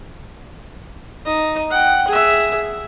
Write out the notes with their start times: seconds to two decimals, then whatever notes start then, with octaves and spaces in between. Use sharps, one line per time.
1.25 D#4 D#5
1.71 F#5 G5
2.08 G#4 E5